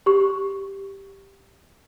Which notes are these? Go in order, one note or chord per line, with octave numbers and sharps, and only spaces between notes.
G4 C#6